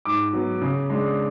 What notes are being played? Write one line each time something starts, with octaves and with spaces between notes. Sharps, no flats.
G#2 D6
F#3 B3
C#3
G#3 D4